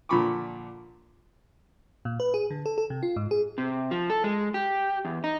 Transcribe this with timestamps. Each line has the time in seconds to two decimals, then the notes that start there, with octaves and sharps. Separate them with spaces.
0.09 A#2 D3 F3 B5 C#6 D6
2.05 A#2
2.20 B4
2.34 G#4
2.50 D3
2.66 A4
2.78 A4
2.90 C3
3.03 F4
3.16 G#2
3.31 G#4
3.58 C3
3.91 F3
4.10 A4
4.24 G#3
4.54 G4
5.05 E2
5.24 D#4